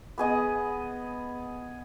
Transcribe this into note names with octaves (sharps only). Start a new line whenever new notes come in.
B3 G#4 D#5